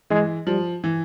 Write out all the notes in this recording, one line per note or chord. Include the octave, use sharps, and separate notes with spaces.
E3 G#3
F3 G3
E3